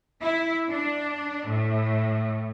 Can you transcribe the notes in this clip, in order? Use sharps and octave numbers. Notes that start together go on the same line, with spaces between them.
E4
D4
A2